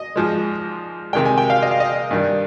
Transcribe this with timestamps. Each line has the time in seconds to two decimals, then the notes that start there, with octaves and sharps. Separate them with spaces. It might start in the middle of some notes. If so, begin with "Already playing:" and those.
Already playing: D#5
0.16 G#2 F3 G#3
1.13 C3 D#3 G#3 G5
1.25 G#5
1.38 G5
1.50 F5
1.62 D#5
1.71 F5
1.80 D#5
2.11 G2 D#3 G3